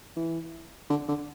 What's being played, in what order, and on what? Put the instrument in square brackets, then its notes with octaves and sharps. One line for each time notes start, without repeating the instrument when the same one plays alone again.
[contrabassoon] E3
D3
D3